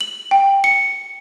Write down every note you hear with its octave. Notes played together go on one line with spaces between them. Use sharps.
F#7
G5
C#7